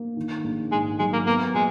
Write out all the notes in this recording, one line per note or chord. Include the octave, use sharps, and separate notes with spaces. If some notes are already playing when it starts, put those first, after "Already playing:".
Already playing: A#3
D#3
A#1
G#2 G#3
F#3 G#3
A#3
A#3 B3
A#2 G#3